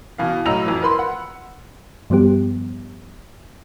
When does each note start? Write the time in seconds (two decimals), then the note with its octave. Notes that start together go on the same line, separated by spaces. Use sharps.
0.18 B2 E3 F5
0.45 A2 F#3 D#5 A#5 E6 F7
0.66 F2 E3
0.82 A#4 B4 B5 C6
0.99 F#5
2.10 G2 F3 G3 B3 G4